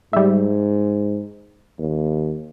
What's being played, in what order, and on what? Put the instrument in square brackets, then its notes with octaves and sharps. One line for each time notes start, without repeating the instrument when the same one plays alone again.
[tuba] G#2 [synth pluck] G3 E5
[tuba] D#2